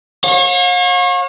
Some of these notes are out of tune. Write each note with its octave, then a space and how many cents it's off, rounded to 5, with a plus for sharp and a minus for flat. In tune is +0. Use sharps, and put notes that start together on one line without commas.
C#5 -35 F5 +45